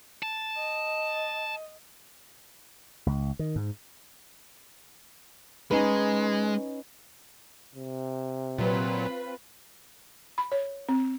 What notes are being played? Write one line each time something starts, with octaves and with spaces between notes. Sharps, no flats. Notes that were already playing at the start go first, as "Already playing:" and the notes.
A5
D#5
C#2
D#3
G#2
G#3 C#4 D#4 B4
C3
A#2 F#3 C4 F4 B4
B5
C#5
C4